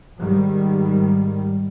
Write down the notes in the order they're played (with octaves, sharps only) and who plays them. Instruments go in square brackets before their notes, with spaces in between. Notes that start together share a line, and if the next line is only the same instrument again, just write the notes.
[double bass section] G#2 D#3 G3